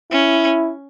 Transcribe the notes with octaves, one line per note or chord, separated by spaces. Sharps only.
C#4 E4